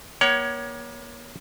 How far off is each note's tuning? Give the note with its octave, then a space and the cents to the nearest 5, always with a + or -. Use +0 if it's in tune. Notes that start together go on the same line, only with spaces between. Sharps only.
A#3 +35 C#5 +15 F#5 +40